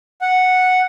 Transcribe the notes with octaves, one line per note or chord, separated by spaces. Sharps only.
F#5